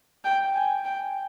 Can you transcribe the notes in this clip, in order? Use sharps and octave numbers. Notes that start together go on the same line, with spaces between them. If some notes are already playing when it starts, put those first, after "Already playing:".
G5
G#5
G5